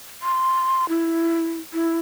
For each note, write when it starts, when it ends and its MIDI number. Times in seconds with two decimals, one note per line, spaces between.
0.22 0.88 84
0.89 1.58 64
1.73 1.98 64